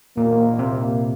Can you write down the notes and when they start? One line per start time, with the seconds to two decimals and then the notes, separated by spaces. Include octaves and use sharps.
0.17 A#2 A#3
0.59 C3